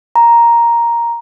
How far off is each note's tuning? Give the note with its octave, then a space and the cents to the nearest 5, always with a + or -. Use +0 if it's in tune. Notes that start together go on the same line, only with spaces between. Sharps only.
A#5 +5